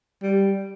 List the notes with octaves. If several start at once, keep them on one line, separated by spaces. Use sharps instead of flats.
G3